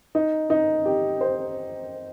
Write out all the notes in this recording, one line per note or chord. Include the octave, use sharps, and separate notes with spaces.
D#4
D#4
G4
C5